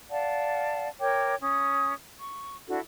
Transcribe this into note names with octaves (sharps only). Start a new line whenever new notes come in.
D5 F5 F#5 A5
A#4 C#5 G5 D6
C#4 D#6
C#6
D4 E4 F#4 A4